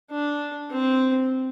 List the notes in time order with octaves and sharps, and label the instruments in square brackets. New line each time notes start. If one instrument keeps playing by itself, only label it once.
[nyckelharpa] D4
C4